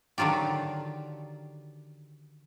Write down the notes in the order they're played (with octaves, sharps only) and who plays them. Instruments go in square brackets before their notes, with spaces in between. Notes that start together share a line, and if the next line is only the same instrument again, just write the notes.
[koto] D3 D#3 F#3 F4 G4